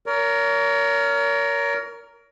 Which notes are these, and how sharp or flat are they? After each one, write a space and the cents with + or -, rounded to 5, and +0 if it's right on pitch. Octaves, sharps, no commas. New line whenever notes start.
A#4 +0 C#5 +35